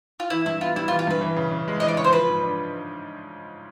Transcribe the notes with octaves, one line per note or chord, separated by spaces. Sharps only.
F4
E3 E4
G2 E4
B3 F4
G3 E4
F4
E3
F4
G2 B4
E3
C#3
C#3
G#3
E3 D#5
D5
C#3 C#5
C5
F3 B4
G#2
D4